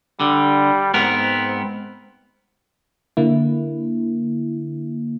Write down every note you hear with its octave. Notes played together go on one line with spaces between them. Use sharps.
D3 G3
G#2 B3 C4 A#4
D3 A#3 E4